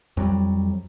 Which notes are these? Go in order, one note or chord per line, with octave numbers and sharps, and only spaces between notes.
F2 F#3 G3